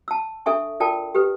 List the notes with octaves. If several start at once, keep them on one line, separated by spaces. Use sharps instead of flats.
A5 E6
D4 A4 E5 G#5 C#6
F4 A4 A#4 D5 G5 A5
G4 A4 B4